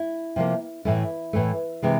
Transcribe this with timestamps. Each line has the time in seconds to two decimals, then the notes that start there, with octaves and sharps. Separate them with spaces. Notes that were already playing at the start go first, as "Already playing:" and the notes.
Already playing: E4
0.36 C3 F3 A#3
0.85 A2 E3 A3 E4
1.33 A2 E3 A3
1.82 C3 E3 G#3